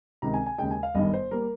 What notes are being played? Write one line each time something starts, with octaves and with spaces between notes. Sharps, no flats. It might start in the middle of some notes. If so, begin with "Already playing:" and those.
C#2 C3 D#3 A#5
G#5
G#5
D#2 C#3 G#3 G5
G#5
F5
G1 G2 D#3 D#5
C5
G3 A#3 A#4